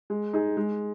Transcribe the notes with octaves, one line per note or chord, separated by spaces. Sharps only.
G#3
D#4 G#4
G#3